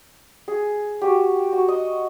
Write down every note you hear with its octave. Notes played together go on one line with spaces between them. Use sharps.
G#4
F#4 G4
F#4
D#5